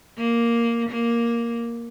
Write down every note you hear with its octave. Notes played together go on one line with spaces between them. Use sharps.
A#3
A#3